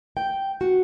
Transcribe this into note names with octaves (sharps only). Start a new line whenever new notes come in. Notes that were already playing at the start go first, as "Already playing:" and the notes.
G5
F#4